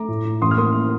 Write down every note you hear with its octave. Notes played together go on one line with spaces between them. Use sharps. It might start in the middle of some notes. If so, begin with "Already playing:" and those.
Already playing: A3 A#5 D6
A2
A2
A1 C6 D#6
F6
A#3 C6 D#6